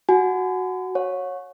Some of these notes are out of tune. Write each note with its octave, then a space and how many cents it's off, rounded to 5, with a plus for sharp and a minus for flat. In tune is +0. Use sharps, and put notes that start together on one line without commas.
F#4 +0 G#5 +20
C#5 -10 F#5 -40